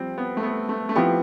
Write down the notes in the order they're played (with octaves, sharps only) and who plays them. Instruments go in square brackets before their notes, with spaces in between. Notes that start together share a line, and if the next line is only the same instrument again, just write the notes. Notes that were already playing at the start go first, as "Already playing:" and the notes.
Already playing: [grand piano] F3 G3 C4
B3
A3
B3
A3
A3
[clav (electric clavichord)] F3 C4 E4 G4 B4 [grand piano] B3